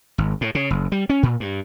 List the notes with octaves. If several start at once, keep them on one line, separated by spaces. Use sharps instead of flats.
G#1
A2
C#3
F#1
G3
C#4
A#2
G2